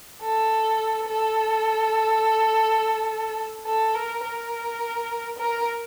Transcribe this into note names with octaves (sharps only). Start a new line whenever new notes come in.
A4
A4
A4
A#4
A#4
A#4